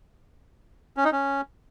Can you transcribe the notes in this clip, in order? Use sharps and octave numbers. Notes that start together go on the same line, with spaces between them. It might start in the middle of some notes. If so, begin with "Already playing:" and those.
C#4
D#4
C#4